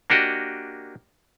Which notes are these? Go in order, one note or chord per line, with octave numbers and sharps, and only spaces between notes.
A#3 D4 F#4 G4 D#5